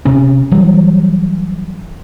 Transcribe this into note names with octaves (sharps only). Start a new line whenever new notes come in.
C3 C#4
E3 F#3 G3